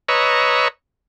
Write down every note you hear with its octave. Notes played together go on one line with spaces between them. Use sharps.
B4 C#5 D#5 A#5 C#6 E6